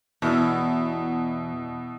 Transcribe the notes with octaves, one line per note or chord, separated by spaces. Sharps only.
E2 B2 E4